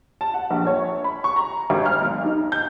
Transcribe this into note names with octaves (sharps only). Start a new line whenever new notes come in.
A5
F#5
A#1
C#5
B5
C#6
A#5
G#1
F6
B1
D#4
G6